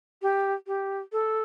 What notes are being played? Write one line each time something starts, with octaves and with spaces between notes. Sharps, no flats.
G4
G4
A4